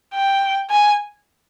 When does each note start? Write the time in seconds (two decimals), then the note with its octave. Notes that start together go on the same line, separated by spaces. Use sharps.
0.14 G5
0.70 G#5